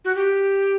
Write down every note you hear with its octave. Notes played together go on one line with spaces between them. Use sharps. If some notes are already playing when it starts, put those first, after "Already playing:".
F#4
G4